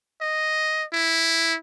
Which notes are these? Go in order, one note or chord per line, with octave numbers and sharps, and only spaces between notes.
D#5
E4